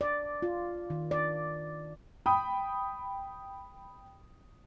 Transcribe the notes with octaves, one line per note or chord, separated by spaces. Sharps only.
D5
F4
D#3
D5
G5 B5 D#6